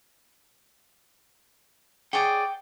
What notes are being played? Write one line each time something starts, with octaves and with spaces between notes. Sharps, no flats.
G#4 C#5 D5 F#5 G5